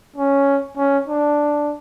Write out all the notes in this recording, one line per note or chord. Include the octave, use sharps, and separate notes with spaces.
C#4
C#4
D4